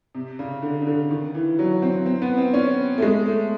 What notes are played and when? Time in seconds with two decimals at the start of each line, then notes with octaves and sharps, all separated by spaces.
0.15 C3
0.39 C#3
0.62 D3
0.81 C#3
0.87 D3
1.11 D#3
1.35 E3
1.59 F#3
1.82 C4
2.06 C4
2.22 B3
2.38 C4
2.54 C#4
2.98 A3
3.02 G#3
3.26 A3